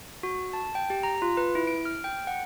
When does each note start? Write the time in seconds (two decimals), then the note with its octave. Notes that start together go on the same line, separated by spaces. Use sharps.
0.23 F#4
0.53 A5
0.75 G5
0.90 G4
1.03 A#5
1.22 F4
1.37 B4
1.55 E4
1.67 D7
1.85 F6
2.04 G5
2.27 F#5